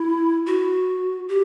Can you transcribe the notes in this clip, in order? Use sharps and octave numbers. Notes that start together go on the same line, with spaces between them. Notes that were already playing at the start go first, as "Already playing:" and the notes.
Already playing: E4
F#4
G4